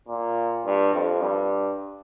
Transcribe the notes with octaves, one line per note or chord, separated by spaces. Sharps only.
A#2
G2
F2
G2